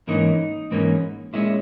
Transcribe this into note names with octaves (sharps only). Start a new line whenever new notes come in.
G#2 E3 A#3 C#4 D#4
G#2 E3 A#3 C#4
A#2 G#3 C#4 E4